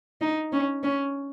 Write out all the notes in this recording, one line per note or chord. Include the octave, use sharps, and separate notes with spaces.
D#4
C#4
C#4